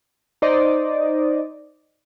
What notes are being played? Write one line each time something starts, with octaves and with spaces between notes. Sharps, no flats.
D#4 C5 D5 D#5